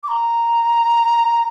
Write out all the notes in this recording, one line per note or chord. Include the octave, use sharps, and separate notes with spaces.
D6
A#5